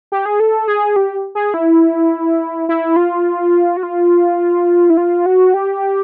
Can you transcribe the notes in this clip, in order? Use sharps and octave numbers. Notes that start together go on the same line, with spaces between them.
G4
G#4
A4
G#4
G4
G#4
E4
E4
F4
F#4
F4
E4
F4
F#4
G4